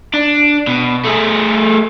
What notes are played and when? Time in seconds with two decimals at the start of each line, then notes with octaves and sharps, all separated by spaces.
0.14 D4
0.67 B2
1.05 A3 G#4